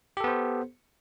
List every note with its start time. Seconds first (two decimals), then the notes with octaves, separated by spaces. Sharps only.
0.17 G4
0.20 A4
0.24 B3
0.28 C5